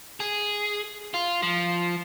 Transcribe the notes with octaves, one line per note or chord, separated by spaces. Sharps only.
G#4
F4
F3